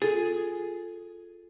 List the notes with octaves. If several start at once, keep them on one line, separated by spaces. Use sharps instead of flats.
F4 G#4 A4